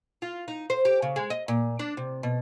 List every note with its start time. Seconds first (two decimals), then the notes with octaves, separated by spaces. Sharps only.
0.22 F4
0.48 D#4
0.70 C5
0.85 G4
1.02 C#3
1.16 G#3
1.30 D#5
1.48 A#2
1.79 D4
1.97 C3
2.23 B2